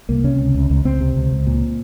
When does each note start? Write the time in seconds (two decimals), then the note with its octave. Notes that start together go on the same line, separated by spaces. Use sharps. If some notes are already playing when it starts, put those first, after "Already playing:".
0.09 C2 A#3
0.24 C3 C#4
0.39 C#2
0.54 C#2
0.70 C#2
0.85 C#2 C4
1.01 C3
1.16 C#2
1.31 C#2
1.47 A#2